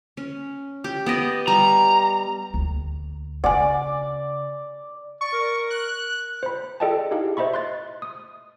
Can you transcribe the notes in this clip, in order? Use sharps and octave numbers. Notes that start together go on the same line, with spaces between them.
C#4
G4
B3 D5 D#5
G3 A#5
D2
C#3 D5 F#5 G#5
D5 C#6
A#4
F#6
C5 B5
G#4 A4 D5 D#5 G5 A5
D#4 E4 G4 G#4 F5
C5 D#5 E5 B5 C#6
C6 F#6 A6
D#6